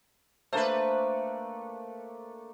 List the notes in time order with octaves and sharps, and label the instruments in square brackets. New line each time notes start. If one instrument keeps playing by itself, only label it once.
[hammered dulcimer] A3 A#3 D4 [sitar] B4 C5